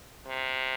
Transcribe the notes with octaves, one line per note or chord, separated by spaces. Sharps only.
C3